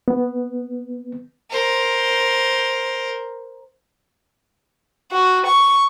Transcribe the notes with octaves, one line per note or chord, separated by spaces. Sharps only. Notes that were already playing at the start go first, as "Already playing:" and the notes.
B3
A#4 C5
F#4
C#6